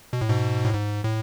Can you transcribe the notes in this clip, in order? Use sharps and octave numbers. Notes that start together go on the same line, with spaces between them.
B2
A2
G#2 B2
A2
G#2
A2